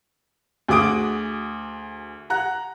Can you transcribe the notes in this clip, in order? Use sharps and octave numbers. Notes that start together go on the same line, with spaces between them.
D2 F#4 G#4 D6 D#6 D7
F#5 A#5 F#6